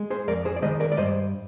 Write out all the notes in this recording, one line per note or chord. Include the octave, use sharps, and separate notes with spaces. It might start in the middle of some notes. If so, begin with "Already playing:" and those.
Already playing: G#3
G#4 C5
F2 A#4 D5
G#4 C5
D5
D#3 G#3 C5 D#5
A#4 D5
D5
G2 C5 D#5